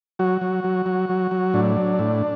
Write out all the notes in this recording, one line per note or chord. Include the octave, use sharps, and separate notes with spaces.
F#3 F#4
F#3
F#3
F#3
F#3
F#3
A2 D4
F#3
A2